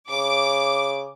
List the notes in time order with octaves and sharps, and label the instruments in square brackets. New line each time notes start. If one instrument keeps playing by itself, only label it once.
[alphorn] C#3 [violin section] D6